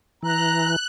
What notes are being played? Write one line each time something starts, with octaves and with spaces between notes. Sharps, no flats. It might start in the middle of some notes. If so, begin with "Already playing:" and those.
E3 A#5 F#6